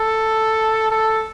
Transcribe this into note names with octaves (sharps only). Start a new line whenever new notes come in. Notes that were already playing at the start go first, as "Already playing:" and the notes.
Already playing: A4
A4